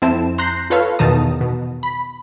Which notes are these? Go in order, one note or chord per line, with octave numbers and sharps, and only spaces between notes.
F2 C4 E4 A5 E7
A#5 C6 F#6 G6 A#6 C7
F4 A4 B4 C#5 F5
E2 B2 D#3 A5 A#5 D#6
B2
B5